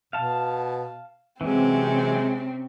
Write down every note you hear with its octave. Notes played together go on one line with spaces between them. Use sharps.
B2 F5 A5
C3 E3 F#3 G#3 C4 C#4